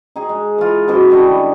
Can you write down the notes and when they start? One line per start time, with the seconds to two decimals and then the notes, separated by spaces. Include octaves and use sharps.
0.16 D#4 G#4
0.29 G#3
0.58 E3 F4
0.88 F#2 B2 E3 D#5
1.10 D3 G3 D#5 C#6